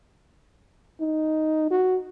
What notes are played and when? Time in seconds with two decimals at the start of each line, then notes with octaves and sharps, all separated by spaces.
1.00 D#4
1.70 F#4